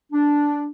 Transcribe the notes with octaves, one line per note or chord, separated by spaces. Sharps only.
D4